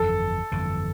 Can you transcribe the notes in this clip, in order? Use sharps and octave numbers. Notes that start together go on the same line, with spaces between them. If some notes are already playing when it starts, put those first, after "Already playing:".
Already playing: G1 F2 E3 A4
G1 F2 E3